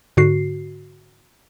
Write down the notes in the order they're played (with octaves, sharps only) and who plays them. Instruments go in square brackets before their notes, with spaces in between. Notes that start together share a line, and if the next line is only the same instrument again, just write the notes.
[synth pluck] G#2 D3 F#4 C7